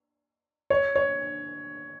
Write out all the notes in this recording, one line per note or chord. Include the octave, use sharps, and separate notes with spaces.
C#5
C#5